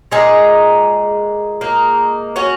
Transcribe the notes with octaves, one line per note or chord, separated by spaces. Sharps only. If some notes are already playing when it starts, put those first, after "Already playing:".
A#2 G#3 D#4 G#4
A#3 D#4
C#4 F#4